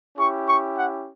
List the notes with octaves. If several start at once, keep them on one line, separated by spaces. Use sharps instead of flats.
C#4 E4 G4 C#6
C#6
F#5